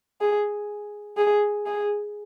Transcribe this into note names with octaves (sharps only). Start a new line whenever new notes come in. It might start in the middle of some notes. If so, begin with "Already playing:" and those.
G#4
G#4
G#4